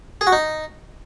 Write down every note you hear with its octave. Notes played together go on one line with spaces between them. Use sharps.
G#4
F#4
D#4